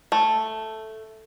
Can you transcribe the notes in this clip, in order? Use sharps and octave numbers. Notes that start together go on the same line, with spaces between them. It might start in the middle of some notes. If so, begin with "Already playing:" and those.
A3